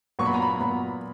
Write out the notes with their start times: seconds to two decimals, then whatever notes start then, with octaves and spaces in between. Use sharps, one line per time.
0.19 A#2 F#3 B3 C#6
0.26 B5
0.34 A#5
0.42 B5
0.60 A#2 F#3 B3 B5